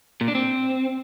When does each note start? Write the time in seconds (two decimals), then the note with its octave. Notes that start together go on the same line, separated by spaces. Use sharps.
0.21 A#2
0.28 D4
0.35 C4